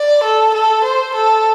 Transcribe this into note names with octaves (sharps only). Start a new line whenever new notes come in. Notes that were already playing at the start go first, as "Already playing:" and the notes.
Already playing: D5
A4
A4
C5
A4